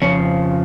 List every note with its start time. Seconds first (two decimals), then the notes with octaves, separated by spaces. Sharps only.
0.02 F2 C#3 F3 C#4